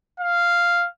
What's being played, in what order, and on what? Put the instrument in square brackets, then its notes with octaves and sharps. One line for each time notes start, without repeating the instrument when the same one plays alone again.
[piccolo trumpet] F5